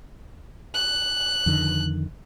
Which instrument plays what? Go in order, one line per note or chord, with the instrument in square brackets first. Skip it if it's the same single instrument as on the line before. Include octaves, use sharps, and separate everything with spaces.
[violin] F#6
[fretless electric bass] F2 D3 D#3